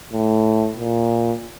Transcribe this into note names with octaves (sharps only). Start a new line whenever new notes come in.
A2
A#2